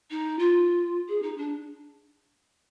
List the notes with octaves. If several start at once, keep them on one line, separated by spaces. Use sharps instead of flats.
D#4
F4
G#4
D#4
D4